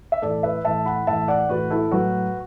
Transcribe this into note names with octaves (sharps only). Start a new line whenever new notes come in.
E5
A2 E3 A4 D5
B4 E5
A2 E3 E5 A5
F#5 B5
A2 E3 E5 A5
D5 F#5
A2 E3 F#4 B4
E4 A4
A2 F#3 F#4 B4